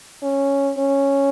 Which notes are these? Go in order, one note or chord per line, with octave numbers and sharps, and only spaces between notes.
C#4
C#4